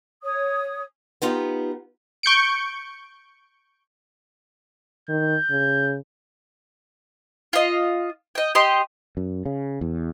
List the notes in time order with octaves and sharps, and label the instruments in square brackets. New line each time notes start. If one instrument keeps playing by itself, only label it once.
[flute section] C#5 D#6
[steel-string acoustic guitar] B3 D#4 F4 G4
[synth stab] C#6 G6 C#7 D7
[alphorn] D#3 [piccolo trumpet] G6
[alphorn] C#3
[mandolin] F4 D#5
D#5 G5
G4 D#5 C6
[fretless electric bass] F#2
C#3
E2